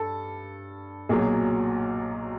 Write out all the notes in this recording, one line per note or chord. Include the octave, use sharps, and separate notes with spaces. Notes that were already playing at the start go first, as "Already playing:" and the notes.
Already playing: G2 A4
B1 A#2 F#3 G#4